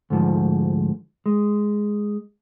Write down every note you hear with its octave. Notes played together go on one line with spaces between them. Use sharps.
D2 G#2 F3
G#3